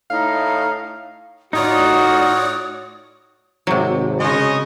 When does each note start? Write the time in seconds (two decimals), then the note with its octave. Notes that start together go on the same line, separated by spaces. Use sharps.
0.10 A2 D#4 F5
1.53 A2 D#4 F4 F#4 C#5 D5 D#6
3.67 G#1 C3 F#3
4.20 C#3 G#3 C#5 D#5